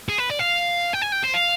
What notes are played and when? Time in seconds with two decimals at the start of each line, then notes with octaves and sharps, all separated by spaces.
0.09 G#4
0.18 B4
0.30 D5
0.39 F5
0.93 G5
1.01 G#5
1.12 G5
1.23 C5
1.34 F5